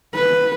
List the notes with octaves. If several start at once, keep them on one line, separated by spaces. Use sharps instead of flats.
B4